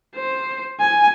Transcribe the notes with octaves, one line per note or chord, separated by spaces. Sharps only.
C5
G#5